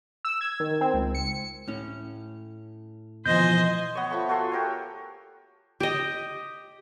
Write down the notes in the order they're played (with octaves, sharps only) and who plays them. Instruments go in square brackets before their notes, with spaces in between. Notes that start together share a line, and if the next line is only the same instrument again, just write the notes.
[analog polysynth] E6
G#6
D#3
C4
C#2
C#7
[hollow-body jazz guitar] A2 C#4
[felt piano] B2 E3 F3 [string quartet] C5 D#5 G#5 [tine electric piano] G6
[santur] B3 C#5
F3 A3 B5 C#6
F#4 A4 G#5 C6
G4 A#4 C#5
[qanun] G4 D#5